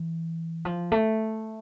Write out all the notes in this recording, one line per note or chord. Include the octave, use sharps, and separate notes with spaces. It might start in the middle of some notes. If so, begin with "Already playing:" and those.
Already playing: E3
F3
A3